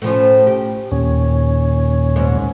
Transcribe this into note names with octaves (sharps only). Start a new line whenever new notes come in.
A2 F3 C#4
G4
D#2 A#2 C#4
G#2